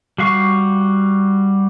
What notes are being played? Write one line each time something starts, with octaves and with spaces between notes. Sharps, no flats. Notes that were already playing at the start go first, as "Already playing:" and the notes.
G3 F#4 F5 C#6